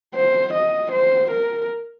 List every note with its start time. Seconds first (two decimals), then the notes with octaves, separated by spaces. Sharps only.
0.15 C5
0.53 D#5
0.92 C5
1.31 A#4